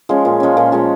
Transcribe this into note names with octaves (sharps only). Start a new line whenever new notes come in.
F3 G#3 C#4
A#2
F3 G#3 C#4
A#2
F3 G#3 C#4